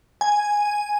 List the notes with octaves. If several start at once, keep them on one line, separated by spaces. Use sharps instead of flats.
G#5